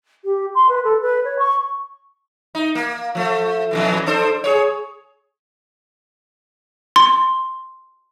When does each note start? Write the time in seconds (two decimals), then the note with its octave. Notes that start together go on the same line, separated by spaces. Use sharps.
0.24 G4
0.55 C6
0.69 B4
0.84 A4
1.02 B4
1.25 C#5
1.39 C#6
2.55 D#4
2.75 A#3
3.15 F3 A3
3.71 F2 B2 E3
4.06 D4 A4 C5
4.44 G#4 B4 C#5
6.96 C6